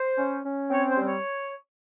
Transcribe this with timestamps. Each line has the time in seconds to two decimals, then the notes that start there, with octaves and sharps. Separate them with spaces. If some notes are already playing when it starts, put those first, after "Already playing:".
Already playing: C5
0.18 C#4
0.45 C#4
0.70 C4 C#5
0.87 C5
0.97 G3
1.05 C#5